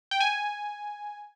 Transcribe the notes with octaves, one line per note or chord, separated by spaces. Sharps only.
G5
G#5